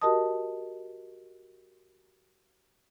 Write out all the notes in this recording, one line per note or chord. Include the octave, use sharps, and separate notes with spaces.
F#4 G4 A#4 D#5 A5 D#6